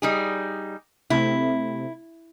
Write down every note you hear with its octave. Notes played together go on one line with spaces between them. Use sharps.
G3 D#4 G#4
C3 A3 C4 E4